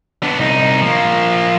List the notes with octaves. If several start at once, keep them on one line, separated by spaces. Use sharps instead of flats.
B3 D4
C2 D#4
F3 A#3